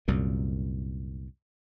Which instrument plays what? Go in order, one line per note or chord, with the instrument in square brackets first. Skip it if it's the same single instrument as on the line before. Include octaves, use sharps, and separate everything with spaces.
[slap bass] C2 F#2 A#2